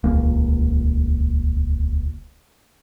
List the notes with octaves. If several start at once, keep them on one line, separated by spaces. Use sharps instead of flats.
D#1 C#2 A#3